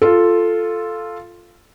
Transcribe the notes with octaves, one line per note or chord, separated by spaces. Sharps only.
F4 A4